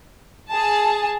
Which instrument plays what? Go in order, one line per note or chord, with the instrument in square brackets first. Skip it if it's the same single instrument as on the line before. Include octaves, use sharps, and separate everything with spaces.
[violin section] G#4 A5